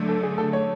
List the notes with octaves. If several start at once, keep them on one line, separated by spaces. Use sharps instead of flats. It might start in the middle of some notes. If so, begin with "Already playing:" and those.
Already playing: D3 F#3 A3
A4
G#4
A4
C#5